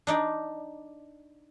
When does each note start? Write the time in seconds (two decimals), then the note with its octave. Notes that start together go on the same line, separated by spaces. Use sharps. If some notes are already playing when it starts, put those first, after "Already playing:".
0.07 D4 D#4 D5